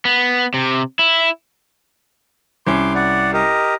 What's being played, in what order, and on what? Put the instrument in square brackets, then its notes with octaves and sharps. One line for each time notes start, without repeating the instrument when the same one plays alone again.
[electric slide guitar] B3
C3
E4
[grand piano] C2 C#4 [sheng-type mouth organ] C6 D6
[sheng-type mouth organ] D5 F#5
G4 A#4 D#5